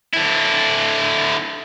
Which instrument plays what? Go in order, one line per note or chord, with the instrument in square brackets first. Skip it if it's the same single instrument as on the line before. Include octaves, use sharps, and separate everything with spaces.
[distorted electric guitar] D3 E4